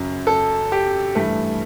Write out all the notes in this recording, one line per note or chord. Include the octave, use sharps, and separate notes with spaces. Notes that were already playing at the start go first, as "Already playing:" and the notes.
Already playing: F#2 C#3 F#3
A4
G4
G2 E3 A3